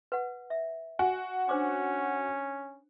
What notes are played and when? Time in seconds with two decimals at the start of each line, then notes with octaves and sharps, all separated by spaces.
0.12 B4 F#5
0.50 E5
0.99 F#4 G#5
1.49 C#4 D4 C5 D6